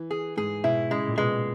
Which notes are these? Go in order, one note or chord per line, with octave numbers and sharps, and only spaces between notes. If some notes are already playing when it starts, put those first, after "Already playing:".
Already playing: E3
G#4
G#2 G#4
B2 E4
C#3 G#3
A#2
B2 G#3